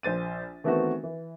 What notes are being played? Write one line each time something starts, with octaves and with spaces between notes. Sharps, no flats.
A#1 C5 A6 D#7
D#3 E3 A3 B3 C4 F#4
E3